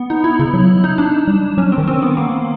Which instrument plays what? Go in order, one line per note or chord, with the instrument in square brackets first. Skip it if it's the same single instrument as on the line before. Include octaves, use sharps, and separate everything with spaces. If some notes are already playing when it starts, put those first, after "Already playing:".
Already playing: [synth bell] B3
D#4
E4
[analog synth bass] C#3 [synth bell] E4
[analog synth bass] F#3
[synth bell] D#4
D4
[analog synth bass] G3
[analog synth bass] F#3 [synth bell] C#4
[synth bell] C4
[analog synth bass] D#3
[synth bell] C4
B3
A#3